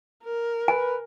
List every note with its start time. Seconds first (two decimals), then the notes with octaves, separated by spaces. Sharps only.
0.24 A#4
0.68 B4 G#5